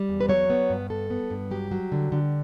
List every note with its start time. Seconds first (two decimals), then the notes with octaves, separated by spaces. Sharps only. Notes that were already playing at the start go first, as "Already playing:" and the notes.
Already playing: G3
0.09 E2
0.21 B4
0.29 F#3 C#5
0.50 B3
0.70 G2
0.90 B3 A4
1.10 B3
1.30 G2
1.51 F#3 G4
1.71 F#3
1.92 D3
2.12 D3